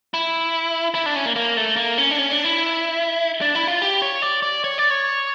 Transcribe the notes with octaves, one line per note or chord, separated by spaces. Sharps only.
E4
E4
D4
C#4
A#3
A#3
A3
A#3
C#4
D4
C#4
D4
E4
D4
E4
F4
G4
C#5
D5
D5
C#5
D5
C#5